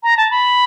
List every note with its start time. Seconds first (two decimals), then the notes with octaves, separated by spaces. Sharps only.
0.03 A#5
0.17 A5
0.31 B5